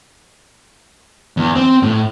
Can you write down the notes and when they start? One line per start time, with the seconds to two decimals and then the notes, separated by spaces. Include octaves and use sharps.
1.37 E2
1.55 C4
1.82 A2